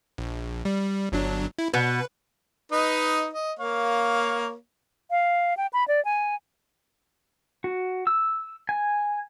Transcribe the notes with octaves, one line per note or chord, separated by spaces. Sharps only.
A#1
G3
G1 F#3 D4
E4
B2 B3 B4
D#4 B4 D#5
D#5
A#3 C#5 F5
F5
G5
B5
D5
G#5
F#4
E6
G#5